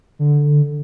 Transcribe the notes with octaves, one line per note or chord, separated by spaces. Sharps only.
D3